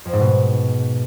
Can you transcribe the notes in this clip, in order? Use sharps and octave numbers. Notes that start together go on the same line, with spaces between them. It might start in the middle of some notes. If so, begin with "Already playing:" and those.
F2
G#2
B2